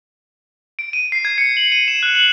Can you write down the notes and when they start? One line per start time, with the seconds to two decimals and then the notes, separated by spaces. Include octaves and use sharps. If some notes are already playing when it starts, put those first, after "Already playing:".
0.79 D7
0.93 D#7
1.12 C7
1.25 G#6
1.38 C#7
1.57 F#7
1.72 D#7
1.88 E7
2.03 F#6
2.15 F#7